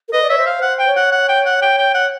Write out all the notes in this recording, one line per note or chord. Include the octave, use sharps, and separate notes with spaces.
A#4
B4 D#5
D5
C#5 E5
C5
F5
C5 F#5
G5
C#5
F#5
F#5
G5
F#5
G5
G5
F#5